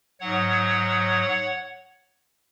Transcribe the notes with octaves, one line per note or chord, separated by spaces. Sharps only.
G#2 F#3 C#5 F#5